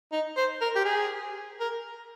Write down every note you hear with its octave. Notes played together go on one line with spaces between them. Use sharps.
D#4
C5
A#4
G4
G#4
A#4